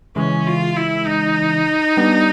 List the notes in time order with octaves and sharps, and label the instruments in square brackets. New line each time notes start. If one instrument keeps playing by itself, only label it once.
[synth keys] C#3 E3 G#3 [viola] C#4
[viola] F4
E4
D#4
[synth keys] G3 B3 D4